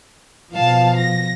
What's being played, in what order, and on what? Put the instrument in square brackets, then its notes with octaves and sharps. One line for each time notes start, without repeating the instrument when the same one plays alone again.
[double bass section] B2 F3 [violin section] F5 A5
[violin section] A#6